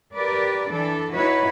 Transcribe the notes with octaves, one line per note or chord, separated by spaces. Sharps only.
G4 A#4 B4 D5
E3 D4 A4
D#4 E4 F#4 B4 C#5